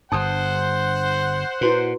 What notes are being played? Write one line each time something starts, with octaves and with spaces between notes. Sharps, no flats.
G1 G2 C5 F#5 A5 D#6
A#2 E4 F#4 B4